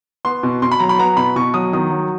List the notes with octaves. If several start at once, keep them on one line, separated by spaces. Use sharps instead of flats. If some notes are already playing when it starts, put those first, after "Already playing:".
B3 C6
B2
B2 C6
B5
F#3 A#5
B5
B3 A#5
B2 B5
B2 C#6
F#3 D#6
D#3 D#6
F#3